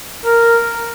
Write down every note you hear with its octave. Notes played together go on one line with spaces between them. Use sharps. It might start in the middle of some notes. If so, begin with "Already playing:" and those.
A#4